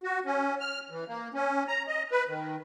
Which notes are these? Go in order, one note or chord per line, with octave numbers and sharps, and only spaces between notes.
F#4
C#4
F6
E3
A#3
C#4
A#5
D#5
B4
D#3